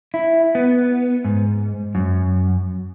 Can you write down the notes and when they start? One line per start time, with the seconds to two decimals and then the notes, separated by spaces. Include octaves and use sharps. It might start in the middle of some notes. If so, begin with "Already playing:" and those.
0.14 E4
0.55 B3
1.25 G#2
1.95 F#2